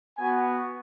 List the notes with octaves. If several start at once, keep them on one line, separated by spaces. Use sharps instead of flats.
B3 F#4 G#5